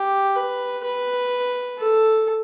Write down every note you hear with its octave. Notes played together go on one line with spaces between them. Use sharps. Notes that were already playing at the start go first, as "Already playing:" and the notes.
Already playing: G4
B4
B4
A4